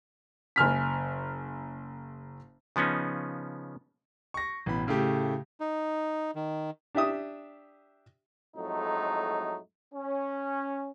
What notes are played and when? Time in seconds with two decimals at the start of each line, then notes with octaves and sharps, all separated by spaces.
0.56 F#1 G#5 F6 B6
2.76 C#3 F3 B3 C#4 D#4
4.34 C#6 A#6
4.66 A1 B2 B5
4.87 A2 C#3 A3 G4
5.60 D#4
6.36 D#3
6.95 D4 G4 E5 D#6
8.56 F2 A2 F#3 G#3 A3 D#4
9.94 C#4